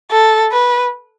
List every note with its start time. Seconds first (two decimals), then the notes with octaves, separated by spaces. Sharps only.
0.11 A4
0.52 B4